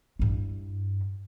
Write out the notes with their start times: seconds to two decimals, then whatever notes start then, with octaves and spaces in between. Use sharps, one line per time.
0.19 G2 E4